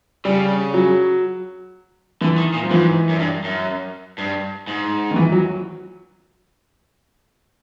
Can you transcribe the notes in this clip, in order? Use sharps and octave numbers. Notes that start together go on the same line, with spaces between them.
C#3 G3
F#3
D3 E3
D#3
A#2
F3
G#2 E3
F#2
G2
F#2
G2
G#2
D#3
E3
F#3